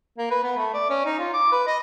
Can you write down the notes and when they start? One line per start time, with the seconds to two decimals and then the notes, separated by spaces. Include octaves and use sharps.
0.18 A#3
0.31 B4
0.43 B3
0.57 A3
0.74 D5
0.90 C#4
1.05 D#4
1.19 F4
1.33 D6
1.52 B4
1.67 D#5